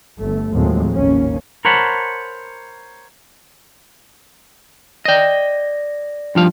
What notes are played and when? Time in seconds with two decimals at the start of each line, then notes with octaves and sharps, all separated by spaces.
0.19 G1 A3
0.53 D#2 A2 F3 F#3 G#3 C4
0.93 G#1 D#2 A#3 C#4
1.65 A#4 C5 C#5 F#5 A5 B5
5.05 D5 D#5 G5 A#6
6.35 G2 F3 F5